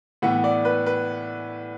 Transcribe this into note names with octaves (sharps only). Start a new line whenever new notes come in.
A2 E3 B3 F#5
D5
B4
B4